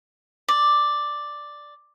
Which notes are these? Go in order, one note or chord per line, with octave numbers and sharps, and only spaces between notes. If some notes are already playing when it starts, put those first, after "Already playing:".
D5